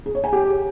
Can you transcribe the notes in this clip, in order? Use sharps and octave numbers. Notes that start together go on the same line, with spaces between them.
G#4
C#5
G#5
G4